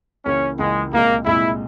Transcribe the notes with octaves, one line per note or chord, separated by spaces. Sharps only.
C#2 C#3 E3 A#3 C#4
C#2 C#3 E3 G#3 A#3
C2 A#2 G#3 A#3
C2 A#2 G#3 E4